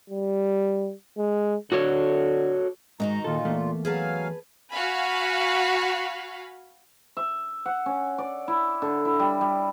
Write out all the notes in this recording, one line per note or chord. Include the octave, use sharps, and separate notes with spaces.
G3
G#3
D3 F#4 A4 C#5
G#2 D#3 D#4 F#4 A#5
D#2 A#2 F4 A4
E2 A3 A#3
F#3 G#4 B4 F5 G#5 A5
F#4 F5 G#5 B5
E5
F#5
C#4
D5
E4
D3
E4
G3
G3